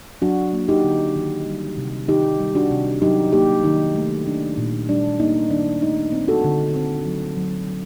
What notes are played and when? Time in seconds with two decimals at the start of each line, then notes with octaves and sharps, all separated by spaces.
0.22 F#3 D4 F#4
0.53 A#3
0.69 D#4 G4
0.84 D3
1.16 D#3
1.47 G3
1.77 C3
2.08 D#3 D#4 G4
2.39 G3
2.55 D4 F#4
2.71 C3
3.02 F#3 D#4 G4
3.33 A#3 D#4 G4
3.64 D#3 D#4
3.95 A3
4.27 D4
4.58 A#2
4.89 G3 D4
5.20 A#3 D#4
5.50 D#3 D4
5.82 A3 D#4
6.12 C4
6.28 F#4 A4
6.44 D3
6.75 C4
7.06 F#3
7.37 F#3
7.69 F#3